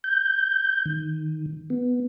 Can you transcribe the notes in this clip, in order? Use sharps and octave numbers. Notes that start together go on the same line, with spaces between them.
G6
D#3
B3